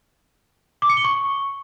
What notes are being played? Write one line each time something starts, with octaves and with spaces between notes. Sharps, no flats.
D6
C#7
G7
C#6